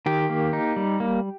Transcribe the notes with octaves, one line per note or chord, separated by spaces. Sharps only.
D#3 G4
A#3
D#4
G3
A#3